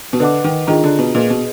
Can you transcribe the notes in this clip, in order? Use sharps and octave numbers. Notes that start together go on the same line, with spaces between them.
B2
D3 B4 D#5 F#5 D6
D#3
D#3 D4 F4 G#4 D#5 A#5
D3
B2
A#2 G#4 B4 D#5
B2